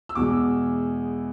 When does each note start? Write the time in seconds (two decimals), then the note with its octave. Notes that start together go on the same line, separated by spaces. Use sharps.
0.09 E6
0.15 E2 B2 G#3 D6